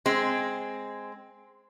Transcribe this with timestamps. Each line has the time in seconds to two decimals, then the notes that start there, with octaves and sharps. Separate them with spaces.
0.06 G#3 C4